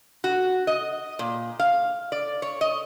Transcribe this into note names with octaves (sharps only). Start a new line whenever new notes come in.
F#4
D#5
A#2
F5
D5
C#5
D#5